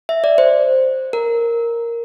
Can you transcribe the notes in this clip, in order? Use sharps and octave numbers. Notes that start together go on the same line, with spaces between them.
E5
D5
C5
A#4